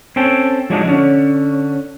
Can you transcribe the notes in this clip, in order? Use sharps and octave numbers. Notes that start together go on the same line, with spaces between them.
C4 C#4 A4 G5
F3 F#3 G#3 A3 D4 D#4
D3 C#4